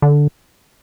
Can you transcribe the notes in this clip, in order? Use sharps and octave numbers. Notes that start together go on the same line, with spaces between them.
D3